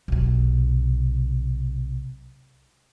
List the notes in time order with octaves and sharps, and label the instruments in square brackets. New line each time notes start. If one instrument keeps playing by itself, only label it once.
[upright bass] B1 C3